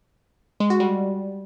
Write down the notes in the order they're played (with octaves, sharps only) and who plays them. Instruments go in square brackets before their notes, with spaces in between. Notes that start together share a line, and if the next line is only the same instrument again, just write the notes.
[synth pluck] G#3
F#4
G3